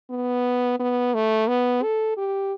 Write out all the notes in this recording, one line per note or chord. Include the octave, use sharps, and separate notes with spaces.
B3
B3
A3
B3
A4
G4